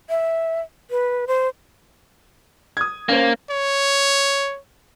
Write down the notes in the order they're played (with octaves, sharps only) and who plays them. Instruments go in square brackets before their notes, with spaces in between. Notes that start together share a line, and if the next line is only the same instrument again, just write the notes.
[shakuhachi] E5
B4
C5
[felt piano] D#6 G#6
[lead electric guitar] A#3 [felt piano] C#4 C5
[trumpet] C#5